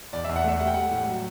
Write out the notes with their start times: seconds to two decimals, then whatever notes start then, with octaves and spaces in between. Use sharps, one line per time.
0.13 E2 D5
0.25 E2 E5
0.36 F#5
0.44 A3 E5
0.60 G3 F#5
0.67 G5
0.74 G3 F#5
0.91 A2
1.08 F#3